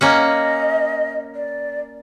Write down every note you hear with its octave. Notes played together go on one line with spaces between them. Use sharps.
A#3 C#4 D#5 F#5
D5